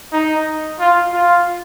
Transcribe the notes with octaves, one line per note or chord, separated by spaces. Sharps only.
D#4
F4
F4